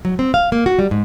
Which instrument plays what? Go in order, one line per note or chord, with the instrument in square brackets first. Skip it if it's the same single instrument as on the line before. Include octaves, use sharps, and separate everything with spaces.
[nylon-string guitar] F#3
C4
F5
A#3
F#4
G3
G#2